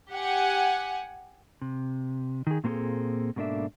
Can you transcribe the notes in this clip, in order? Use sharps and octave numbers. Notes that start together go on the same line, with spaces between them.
G4 F#5 G#5
C3
D#3 G#4
A#2 A#3 C4 F#4 G#4 A4
G#2 B2 A#3 D4 A4 E5